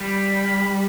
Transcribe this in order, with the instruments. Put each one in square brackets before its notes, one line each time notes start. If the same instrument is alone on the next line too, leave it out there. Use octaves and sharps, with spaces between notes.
[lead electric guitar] G3 [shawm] B5